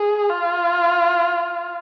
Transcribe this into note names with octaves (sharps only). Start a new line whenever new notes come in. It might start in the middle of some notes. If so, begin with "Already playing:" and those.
Already playing: G#4
F4